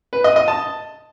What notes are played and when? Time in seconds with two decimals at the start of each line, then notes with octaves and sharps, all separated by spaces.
0.13 B4
0.24 D#5
0.36 D#5
0.48 A5